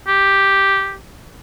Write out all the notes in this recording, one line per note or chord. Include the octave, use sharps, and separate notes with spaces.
G4